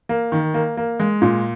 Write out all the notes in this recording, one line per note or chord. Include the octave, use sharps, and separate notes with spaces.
A#3
D#3
A#3
A#3
G#3
A#2